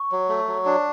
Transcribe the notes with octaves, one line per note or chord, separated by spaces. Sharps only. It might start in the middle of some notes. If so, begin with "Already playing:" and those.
Already playing: C#6
F#3
A3
F#3
D4